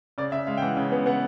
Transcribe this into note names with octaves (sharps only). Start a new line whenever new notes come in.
C#3 D5
C#3 E5
G#3 F5
G5
E3 F#5
C#3
B3
B3 F#5